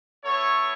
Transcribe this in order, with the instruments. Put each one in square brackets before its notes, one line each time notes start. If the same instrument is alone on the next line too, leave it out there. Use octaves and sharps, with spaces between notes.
[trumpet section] B3 E4 A4 C#5